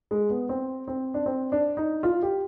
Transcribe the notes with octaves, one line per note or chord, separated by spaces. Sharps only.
G#3
B3
C4
C4
D4
C4
D4
D#4
F4
G4